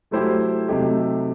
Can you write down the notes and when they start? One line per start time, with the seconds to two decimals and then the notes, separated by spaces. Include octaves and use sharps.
0.11 F#3 A3 E4 G4 C5
0.68 C3 F#3 A3 D#4 G4